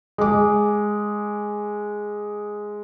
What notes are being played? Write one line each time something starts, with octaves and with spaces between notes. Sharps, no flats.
G#3 D6